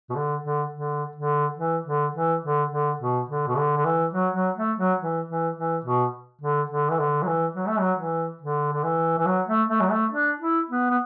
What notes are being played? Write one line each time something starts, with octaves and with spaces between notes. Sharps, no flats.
B2
D3
D3
D3
D3
E3
D3
E3
D3
D3
B2
D3
B2
D3
D3
E3
F#3
F#3
A3
F#3
E3
E3
E3
B2
D3
D3
E3
D3
F#3
E3
F#3
A3
F#3
E3
D3
D3
E3
E3
F#3
A3
A3
F#3
A3
D4
E4
B3
B3